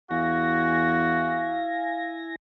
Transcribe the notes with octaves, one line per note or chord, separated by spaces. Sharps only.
E2 E4 F#4 F5 G#5 A#6